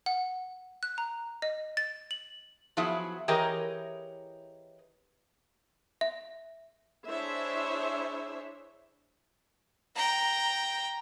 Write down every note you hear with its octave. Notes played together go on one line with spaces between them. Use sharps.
F#5
F#6
A#5
D#5
A6
F#7
F3 F#3 B3 E4 G#4
E3 G4 G#4 A#4 C#5 D#5
E5
D4 E4 G#4 C5 C#5 E5
G5 A#5